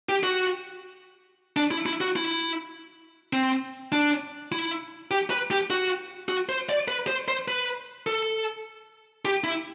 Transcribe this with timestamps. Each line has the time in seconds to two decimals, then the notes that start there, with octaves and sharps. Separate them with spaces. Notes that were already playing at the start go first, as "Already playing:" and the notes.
0.09 G4
0.23 F#4
1.57 D4
1.71 E4
1.86 E4
2.01 F#4
2.16 E4
3.33 C4
3.92 D4
4.52 E4
5.11 G4
5.30 B4
5.51 G4
5.70 F#4
6.29 F#4
6.49 C5
6.69 D5
6.88 B4
7.07 C5
7.28 C5
7.48 B4
8.07 A4
9.25 G4
9.44 E4